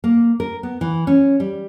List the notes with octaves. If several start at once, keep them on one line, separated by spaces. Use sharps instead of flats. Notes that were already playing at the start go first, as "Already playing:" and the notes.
A#3
A#4
B3
E3
C#4
G3